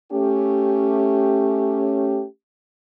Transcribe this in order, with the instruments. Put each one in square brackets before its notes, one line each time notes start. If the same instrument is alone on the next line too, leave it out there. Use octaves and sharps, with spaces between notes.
[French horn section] A3 C#4 G4